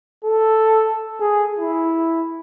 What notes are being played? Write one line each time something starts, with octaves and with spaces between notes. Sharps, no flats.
A4
G#4
E4